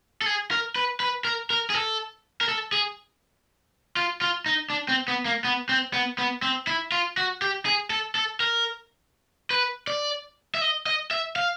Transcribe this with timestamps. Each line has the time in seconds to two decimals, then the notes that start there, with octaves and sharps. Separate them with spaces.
0.22 A4
0.26 G#4
0.51 A#4
0.76 B4
1.00 B4
1.25 A#4
1.50 A#4
1.70 G#4
1.74 A4
2.41 A#4
2.49 A4
2.73 G#4
3.97 F4
4.22 F4
4.46 D#4
4.70 D4
4.89 C4
5.08 B3
5.26 A#3
5.45 B3
5.69 C4
5.94 B3
6.18 B3
6.42 C4
6.67 E4
6.92 F4
7.18 F#4
7.42 G4
7.66 G#4
7.90 A4
8.15 A4
8.40 A#4
9.51 B4
9.87 D5
10.55 E5
10.61 D#5
10.86 D#5
11.11 E5
11.36 F5